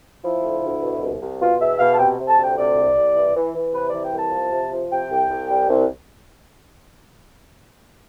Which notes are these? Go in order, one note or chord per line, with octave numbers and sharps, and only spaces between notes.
F3 E4
D2
D2
B2
C2
C2
B2 F4
E2 E5
B2 F5
A5
C3 G5
C3
A5
D2
G5
C3 D5
C2
C2
E3
E3
E3
C3 B4
E3 D5
G5
C2 A5
F3
C3
F3
C3 G5
C2
C2
G3
C2